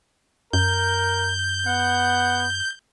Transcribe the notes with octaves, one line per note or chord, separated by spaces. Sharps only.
F#2 A#4 G6
B3 F#5